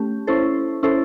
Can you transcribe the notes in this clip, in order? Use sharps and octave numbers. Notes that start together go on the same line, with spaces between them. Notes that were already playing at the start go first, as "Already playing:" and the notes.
Already playing: A3 C#4 G4
C#4 E4 A4 C5
C#4 E4 A4 C5